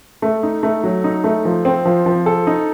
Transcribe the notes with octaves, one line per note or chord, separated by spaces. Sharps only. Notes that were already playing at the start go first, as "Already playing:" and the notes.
A3
D#4
A3
F#3
D#4
A3
F3
C4
F3
F3
A4
D#4